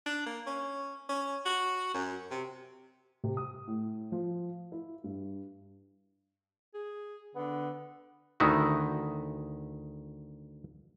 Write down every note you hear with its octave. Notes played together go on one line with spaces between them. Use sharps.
D4
A#3
C#4
C#4
F#4
F#2
C3
C3
D#6
A2
F3
E4
G2
G#4
D3 B3
D2 D#3 D#4 E4 F#4